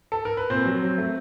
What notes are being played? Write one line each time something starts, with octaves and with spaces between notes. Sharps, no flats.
A4
A#4
B4
A#2 C4 C5
F#3
F#3
A3